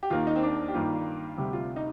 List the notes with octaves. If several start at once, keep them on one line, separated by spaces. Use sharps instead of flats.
G4
D#2 D#3 A#3 F4
D#4
C4
D4
G4
G2 D#3 G3 A#3 F4
D2 C3 G3 G4
F4
D#4